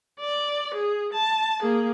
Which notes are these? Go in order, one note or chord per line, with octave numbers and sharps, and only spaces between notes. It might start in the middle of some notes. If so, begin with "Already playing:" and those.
D5
G#4
A5
A#3 G#4